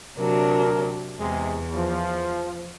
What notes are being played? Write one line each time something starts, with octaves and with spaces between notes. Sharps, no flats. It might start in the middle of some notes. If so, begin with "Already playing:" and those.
D2 C3 F#3 D4 A#4
E2 C3 G#3
F3